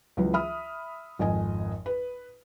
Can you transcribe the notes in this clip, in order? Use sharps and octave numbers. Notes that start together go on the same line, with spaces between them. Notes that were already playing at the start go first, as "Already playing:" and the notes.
C#2 E3 F#3 B4
E5 B5 D#6 F6
G#1 F2 D#5 G#5
B4